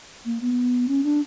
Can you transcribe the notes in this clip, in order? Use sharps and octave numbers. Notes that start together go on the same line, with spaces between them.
A#3
B3
C#4
D4